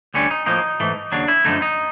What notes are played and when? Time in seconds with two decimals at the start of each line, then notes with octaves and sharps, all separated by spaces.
0.14 D2 D3 G3 C#4
0.31 D#4
0.46 A2 F3 A#3 D#4
0.80 G#2 E3 A3
1.12 D#2 C#3 F#3 D4
1.28 E4
1.45 F#2 D3 F3 A3 D#4
1.62 D#4